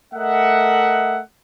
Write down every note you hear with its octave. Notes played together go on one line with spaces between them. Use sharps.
A3 A#4 D#5 E5 F#5